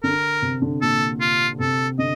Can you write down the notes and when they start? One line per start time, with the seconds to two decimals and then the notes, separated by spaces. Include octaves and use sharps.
0.03 D3 A#4
0.42 C3
0.62 D3
0.81 A#2 A4
1.21 F4
1.59 C3 A4
1.98 D3 D#5